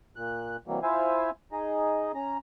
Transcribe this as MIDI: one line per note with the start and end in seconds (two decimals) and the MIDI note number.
0.16 0.57 46
0.16 0.57 90
0.67 0.80 48
0.67 0.80 52
0.67 0.80 54
0.67 0.80 55
0.67 0.80 58
0.83 1.30 64
0.83 1.30 65
0.83 1.30 72
0.83 1.30 76
0.83 1.30 77
0.83 1.30 80
1.52 2.12 63
1.52 2.12 68
1.52 2.12 75
2.15 2.37 61
2.15 2.37 82